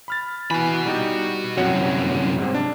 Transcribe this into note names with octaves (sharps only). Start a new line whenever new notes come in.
B5 F6 A6
E3 F#4 G#5 B5
G3 D#4 G4
C2 F#2 C#5 F#5
G#2 C3
D4